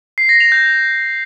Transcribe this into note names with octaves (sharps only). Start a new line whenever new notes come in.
C7
A#6
F7
G6